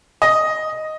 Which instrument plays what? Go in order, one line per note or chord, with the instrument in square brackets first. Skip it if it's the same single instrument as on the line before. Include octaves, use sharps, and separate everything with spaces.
[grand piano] D#5